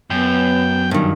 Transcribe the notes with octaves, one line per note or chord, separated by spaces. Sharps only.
F#2 B3 G5
G2 D#3